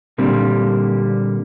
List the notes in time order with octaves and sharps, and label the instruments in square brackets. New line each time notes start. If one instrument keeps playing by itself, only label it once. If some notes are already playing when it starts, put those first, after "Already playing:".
[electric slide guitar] A#2 D3 G3 A#3 C4